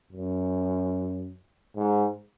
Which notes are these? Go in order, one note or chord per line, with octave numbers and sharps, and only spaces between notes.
F#2
G#2